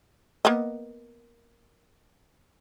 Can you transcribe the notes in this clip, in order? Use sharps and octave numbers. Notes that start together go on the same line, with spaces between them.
A#3 B3 D#5